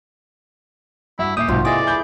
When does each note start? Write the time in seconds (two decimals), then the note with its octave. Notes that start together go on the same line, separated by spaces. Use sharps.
1.19 G2 E4 F#4 E5
1.37 D#1 G4 E5 D#6 C7
1.48 B1 G#2 C3 F4 F#4
1.65 E3 G#4 D5 D#5 D6
1.87 B5 G6